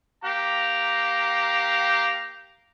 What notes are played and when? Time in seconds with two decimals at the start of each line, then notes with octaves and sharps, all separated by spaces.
0.24 A#3 G4 F5 A#5